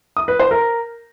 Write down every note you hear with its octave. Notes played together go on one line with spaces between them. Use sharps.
D#6
B4
C5
A#4